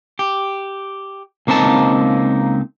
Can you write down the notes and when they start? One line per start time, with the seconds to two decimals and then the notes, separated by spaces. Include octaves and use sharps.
0.19 G4
1.47 C#2 A#3 C4 D#4 A5